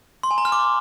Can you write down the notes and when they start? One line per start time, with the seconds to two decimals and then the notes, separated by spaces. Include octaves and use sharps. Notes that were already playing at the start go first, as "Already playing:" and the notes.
0.23 C6
0.31 G#5
0.38 A#5
0.45 F6
0.52 D6